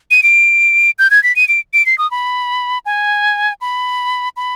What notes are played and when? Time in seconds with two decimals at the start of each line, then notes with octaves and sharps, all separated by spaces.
0.11 D#7
0.23 D7
0.99 G6
1.11 G#6
1.23 B6
1.36 D#7
1.48 D7
1.73 D7
1.86 C7
1.98 D#6
2.11 B5
2.86 G#5
3.61 B5
4.36 B5